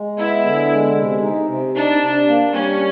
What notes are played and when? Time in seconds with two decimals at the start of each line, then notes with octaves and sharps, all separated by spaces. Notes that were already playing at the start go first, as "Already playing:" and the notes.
Already playing: G#3
0.17 B3 E4
0.44 D3
0.70 G#3
0.96 C3
1.22 D#4
1.48 C3
1.75 D4 D#4
2.01 C3
2.27 A#3
2.53 G3 C#4